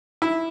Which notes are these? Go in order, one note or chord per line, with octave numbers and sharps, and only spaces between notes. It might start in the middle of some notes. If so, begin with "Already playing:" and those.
E4